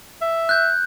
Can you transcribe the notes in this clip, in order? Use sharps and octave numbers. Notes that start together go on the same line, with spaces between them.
E5
F#6 G6